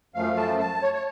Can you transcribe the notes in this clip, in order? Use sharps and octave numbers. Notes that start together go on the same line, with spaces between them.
F#2 F3 A3 F5
A5
A5
C#5
C#5